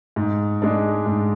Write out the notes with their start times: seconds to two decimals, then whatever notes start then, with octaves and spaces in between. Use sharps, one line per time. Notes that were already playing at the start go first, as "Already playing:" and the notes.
0.16 G#2
0.62 G#3 D4
1.06 G#2